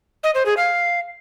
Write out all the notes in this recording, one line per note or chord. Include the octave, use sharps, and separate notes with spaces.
D#5
C5
G#4
F5